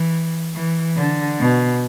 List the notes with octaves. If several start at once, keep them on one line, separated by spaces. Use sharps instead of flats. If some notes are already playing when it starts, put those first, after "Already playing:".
Already playing: E3
E3
D3
B2